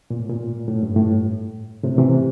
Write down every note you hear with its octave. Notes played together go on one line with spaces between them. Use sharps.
A#2
A2
A#2
A2
G2
A2
A2 C3
C3 E3